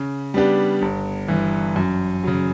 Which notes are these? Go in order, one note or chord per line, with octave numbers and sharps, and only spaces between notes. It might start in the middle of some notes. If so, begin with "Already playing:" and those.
Already playing: C#3
G3 B3 D4 G4
G1
G2 E3
F#2
C#3 F#3